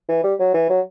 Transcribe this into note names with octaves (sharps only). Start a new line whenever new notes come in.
E3
G3
F#3
E3
F#3